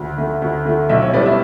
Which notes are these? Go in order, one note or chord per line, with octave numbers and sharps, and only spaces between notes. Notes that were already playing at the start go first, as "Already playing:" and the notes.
Already playing: D2
D3 A3
D2
D3 A3
B1 E5
C#5
A2 G3 B3 D5
E5